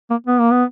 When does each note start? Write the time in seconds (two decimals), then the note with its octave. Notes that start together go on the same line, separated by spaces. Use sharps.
0.10 A#3
0.27 B3
0.39 A#3
0.51 B3